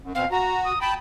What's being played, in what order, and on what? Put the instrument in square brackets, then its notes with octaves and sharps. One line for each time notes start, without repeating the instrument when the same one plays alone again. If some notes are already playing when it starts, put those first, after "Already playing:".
[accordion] F#2
[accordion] B2 C4 [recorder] F5
[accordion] F#4 [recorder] A#5
[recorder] D#6
[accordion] G5 A5 [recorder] B5